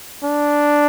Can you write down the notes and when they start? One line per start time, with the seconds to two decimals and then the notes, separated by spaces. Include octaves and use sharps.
0.24 D4